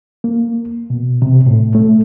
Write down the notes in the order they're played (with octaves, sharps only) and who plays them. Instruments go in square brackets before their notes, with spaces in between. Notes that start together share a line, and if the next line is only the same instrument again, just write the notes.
[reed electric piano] A#3
B2
C3
A2
A3